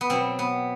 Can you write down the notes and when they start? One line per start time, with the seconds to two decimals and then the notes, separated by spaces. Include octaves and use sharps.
0.01 B3
0.10 B2 F#3 C4
0.39 B3